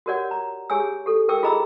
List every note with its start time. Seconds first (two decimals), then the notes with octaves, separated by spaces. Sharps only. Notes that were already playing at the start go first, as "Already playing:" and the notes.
0.06 F#4 G4 A#4 C#5 D5 F#5
0.31 A#5
0.70 G4 G#4 C#5 G#5 E6
1.06 G4 A4
1.28 E4 G4 A#4 G5 D6 E6
1.43 F4 G#4 D#5 A#5 B5 E6